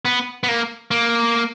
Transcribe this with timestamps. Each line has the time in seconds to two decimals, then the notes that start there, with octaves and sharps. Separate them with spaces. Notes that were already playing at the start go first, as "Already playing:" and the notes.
0.05 B3
0.43 B3
0.48 A#3
0.91 A#3